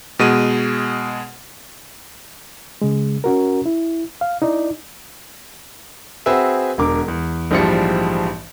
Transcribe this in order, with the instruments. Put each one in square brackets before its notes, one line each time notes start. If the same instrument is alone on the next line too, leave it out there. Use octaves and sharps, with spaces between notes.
[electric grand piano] B2 G#3 D#7
[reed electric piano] C#3 G#3
C#4 F#4 A#4
E4
F5
D#4 E4 D5
[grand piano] C4 F#4 G#4 B4 E5
E1 D3 A#4 D6
E2
A#1 G#2 E3 F3 G3 C#7